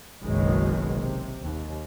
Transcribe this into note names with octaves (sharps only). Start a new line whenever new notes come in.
F#1 B1 F#2 B2 D#3 G#3
C3
D#2